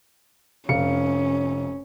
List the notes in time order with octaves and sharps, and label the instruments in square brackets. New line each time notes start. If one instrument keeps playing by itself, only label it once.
[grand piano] F1 F5 C#7 [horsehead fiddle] C#4